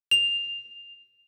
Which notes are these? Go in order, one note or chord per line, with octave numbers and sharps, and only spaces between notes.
F7